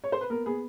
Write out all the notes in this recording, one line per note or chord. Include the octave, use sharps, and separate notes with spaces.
C#5
C5
B4
B3 A#4
B3 G#4